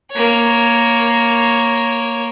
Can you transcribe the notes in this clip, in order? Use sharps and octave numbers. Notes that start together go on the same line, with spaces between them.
A#3 C#5